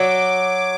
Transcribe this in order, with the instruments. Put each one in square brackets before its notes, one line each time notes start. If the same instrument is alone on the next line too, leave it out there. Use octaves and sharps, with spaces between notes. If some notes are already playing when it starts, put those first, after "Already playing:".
Already playing: [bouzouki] F#3 [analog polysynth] D6